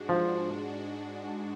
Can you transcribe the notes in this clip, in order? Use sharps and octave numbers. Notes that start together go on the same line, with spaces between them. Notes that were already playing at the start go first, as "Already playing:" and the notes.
Already playing: G#2 G#3 D4 F#4
F3